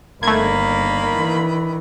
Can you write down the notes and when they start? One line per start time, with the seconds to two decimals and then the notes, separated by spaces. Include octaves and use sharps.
0.23 G1 D#3 A3 A#3 D4 B5 G#6
1.17 E3